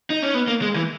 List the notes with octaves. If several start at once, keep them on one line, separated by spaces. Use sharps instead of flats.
D#4
C#4
B3
A#3
G#3
E3